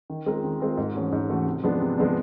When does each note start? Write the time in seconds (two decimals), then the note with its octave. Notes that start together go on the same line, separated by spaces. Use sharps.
0.10 D#3
0.26 G#3 C4 F4 A#4
0.44 D#3
0.60 G#3 C4 F4 A#4
0.77 G#2
0.95 E3 A3 C#4 F#4
1.12 G#2
1.29 E3 A3 C#4 F#4
1.46 C3
1.64 F3 G#3 B3 D4
1.81 C3
1.98 F3 G#3 B3 D4